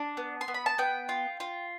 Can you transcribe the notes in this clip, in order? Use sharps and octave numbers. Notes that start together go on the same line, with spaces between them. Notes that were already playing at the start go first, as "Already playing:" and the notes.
Already playing: D4
B3
C6
B3
B5
A5
B3 G5
F4
F4